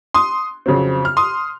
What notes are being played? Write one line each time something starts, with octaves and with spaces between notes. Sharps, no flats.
C6 D#6
F2 C#3 F#3 C4
F6
C6 D#6